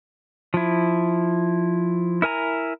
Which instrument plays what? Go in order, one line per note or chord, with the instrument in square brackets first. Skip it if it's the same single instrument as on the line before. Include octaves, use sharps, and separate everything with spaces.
[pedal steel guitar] F3 E4
E4 A#4 G#5 A#5